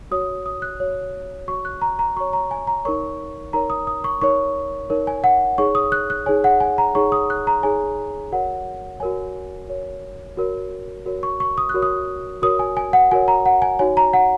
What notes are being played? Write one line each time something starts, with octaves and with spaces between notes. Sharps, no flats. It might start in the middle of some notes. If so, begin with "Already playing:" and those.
F#4 C#5 D#6
D#6
F#6
F#4 C#5
F#4 C#5 C#6
F#6
A#5
A#5
F#4 C#5 C#6
A#5
G#5
A#5
D#4 A#4 C#5 C#6
D#4 A#4 C#5 A#5
D#6
D#6
C#6
D#4 A#4 C#5 C#6
D#4 A#4 C#5
G#5
F#5
D#4 G#4 C#5 C#6
D#6
F#6
F#6
D#4 G#4 C#5 G#5
F#5
G#5
A#5
D#4 G#4 C#5 C#6
D#6
F#6
A#5
D#4 G#4 C#5 G#5
F#4 A#4 C#5 F#5
F#4 A#4 C#5 G#5
F#4 A#4 C#5
F#4 A#4 C#5
F#4 A#4 C#5
C#6
C#6
D#6
F#6
F#4 A#4 C#5
D#6
F#4 A#4 C#5 D#6
G#5
G#5
F#5
F#4 A#4 C#5 G#5
A#5
F#5
G#5
D#4 F#4 C#5 G#5
A#5
F#5